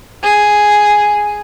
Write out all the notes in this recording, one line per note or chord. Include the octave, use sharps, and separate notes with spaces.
G#4